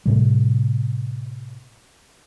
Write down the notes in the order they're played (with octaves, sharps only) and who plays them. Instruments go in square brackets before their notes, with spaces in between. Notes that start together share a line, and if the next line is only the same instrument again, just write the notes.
[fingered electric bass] A2 C3 G3